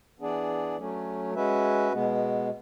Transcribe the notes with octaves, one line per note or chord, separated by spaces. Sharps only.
E3 B3 D4 G#4 D5
F#3 A3 C#4
G#3 C#4 F#4 B4 E5
B2 G#3 B3